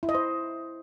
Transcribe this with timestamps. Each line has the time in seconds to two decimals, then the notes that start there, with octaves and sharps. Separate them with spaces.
0.03 E4
0.09 D#5
0.15 C5